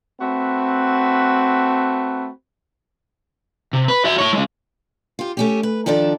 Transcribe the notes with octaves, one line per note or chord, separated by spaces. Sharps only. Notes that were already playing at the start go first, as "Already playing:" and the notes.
A3 C4 F#4 B4
C3
B4
F#4 E5
E4 C#5
G#3 C#4
F4 G4
A3 C#4 G4
B4
D#3 F3 D4 A4 D5